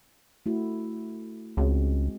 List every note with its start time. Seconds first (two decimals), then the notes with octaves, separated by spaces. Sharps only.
0.46 A3 E4 F#4
1.57 C#2 G#3 C4 F#4